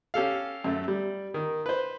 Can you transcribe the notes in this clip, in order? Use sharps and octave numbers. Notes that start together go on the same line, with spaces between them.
C#4 G4 A4 F5
F#2 A3
G3
D#3
B4 C5